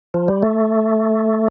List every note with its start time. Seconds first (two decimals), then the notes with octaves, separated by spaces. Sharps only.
0.14 F3
0.28 G3
0.43 A3